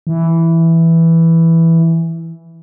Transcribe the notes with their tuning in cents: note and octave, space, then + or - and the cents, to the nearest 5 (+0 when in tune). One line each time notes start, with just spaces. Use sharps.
E3 +0